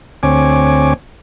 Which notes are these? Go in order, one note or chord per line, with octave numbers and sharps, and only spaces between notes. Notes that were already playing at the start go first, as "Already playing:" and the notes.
D2 C4 C#5 G#5 D6